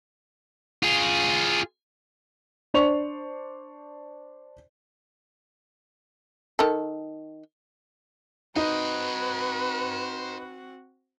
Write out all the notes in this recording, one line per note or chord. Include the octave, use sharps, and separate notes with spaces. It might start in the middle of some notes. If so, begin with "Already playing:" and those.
F4 G#4
D4 C5 D5 C#6 F7
D#3 A4
C4 D#4 F#4 B4 C5 D#5